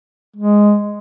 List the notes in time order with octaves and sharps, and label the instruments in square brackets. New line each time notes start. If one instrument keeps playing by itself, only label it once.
[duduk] G#3